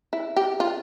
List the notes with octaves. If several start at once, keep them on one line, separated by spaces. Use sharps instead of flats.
E4
G4
F4